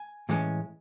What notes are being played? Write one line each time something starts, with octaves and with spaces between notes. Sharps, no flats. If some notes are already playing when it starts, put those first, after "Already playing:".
Already playing: G#5
A2 E3 G#3 C#4